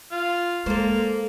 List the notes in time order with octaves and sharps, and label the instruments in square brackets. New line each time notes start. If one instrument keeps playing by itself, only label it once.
[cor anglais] F4
[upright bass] G#3 [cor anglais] A#3 [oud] A4 C5